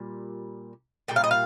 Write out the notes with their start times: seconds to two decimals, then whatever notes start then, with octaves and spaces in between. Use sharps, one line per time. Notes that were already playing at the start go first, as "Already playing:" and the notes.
Already playing: A#2 G3
1.08 A#2 G3 G5
1.16 F5
1.24 D#5
1.31 F5